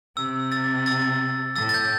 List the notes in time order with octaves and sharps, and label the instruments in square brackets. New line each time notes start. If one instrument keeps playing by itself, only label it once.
[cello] C3 [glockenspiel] E6
[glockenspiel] E6 A6
E6 A6
[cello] A2 [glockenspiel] E6 A6
[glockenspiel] A6
G6